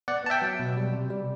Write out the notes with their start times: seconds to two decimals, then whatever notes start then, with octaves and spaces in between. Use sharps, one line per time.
0.08 B3 D5 F#5
0.25 B3 A5
0.30 E5 G5
0.42 F#3
0.59 B2
0.77 G3
0.93 C3
1.10 G3